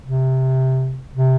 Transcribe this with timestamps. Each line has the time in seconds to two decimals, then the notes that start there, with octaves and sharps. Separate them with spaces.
0.05 C3
1.13 C3